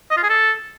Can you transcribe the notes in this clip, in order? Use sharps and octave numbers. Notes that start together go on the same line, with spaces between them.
D#5
F4
G#4
A4